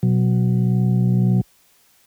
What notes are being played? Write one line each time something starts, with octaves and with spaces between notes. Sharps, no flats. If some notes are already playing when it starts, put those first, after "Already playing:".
B2 F#3